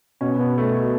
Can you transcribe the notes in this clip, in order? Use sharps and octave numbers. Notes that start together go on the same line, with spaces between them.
B2 C#4
B3
A3